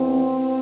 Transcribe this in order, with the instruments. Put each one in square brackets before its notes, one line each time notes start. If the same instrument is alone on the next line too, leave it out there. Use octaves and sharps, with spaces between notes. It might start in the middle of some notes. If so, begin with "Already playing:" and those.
Already playing: [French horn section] E2 C4